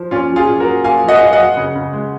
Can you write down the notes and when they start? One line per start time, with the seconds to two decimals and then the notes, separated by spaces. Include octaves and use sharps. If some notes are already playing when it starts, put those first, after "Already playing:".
Already playing: F3
0.11 A#2 C#4 F4
0.30 F#3
0.36 F4 G#4
0.48 A#2
0.60 F#4 A#4
0.66 F#3
0.84 A#2 F5 G#5
1.03 F#3
1.08 D#5 F#5
1.18 D#5
1.21 A#2 F5
1.33 D#5 F#5
1.39 F#3
1.57 C#3
1.75 C#3
1.93 G#3